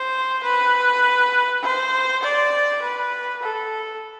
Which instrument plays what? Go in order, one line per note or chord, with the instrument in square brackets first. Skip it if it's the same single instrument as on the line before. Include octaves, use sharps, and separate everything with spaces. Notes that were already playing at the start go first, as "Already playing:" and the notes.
Already playing: [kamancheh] C5
B4
C5
D5
B4
A4